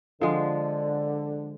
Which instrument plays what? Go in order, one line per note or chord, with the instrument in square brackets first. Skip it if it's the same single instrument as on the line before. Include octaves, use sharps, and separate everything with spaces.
[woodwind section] D3 [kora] F3 G#3